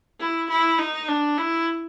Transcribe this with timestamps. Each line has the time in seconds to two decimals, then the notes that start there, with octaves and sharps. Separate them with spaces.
0.20 E4
0.49 E4
0.79 D#4
1.09 D4
1.38 E4